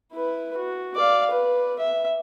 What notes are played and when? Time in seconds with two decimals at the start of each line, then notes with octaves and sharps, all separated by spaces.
0.12 E4 B4
0.57 F#4
0.96 D5 F5
1.31 B4
1.79 E5